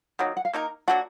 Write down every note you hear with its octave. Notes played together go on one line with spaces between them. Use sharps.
D#3 F#3 A#3 F#5
F#5
F5
A#3 D#4 A#4
F#3 A#3 D4 F#4 F#5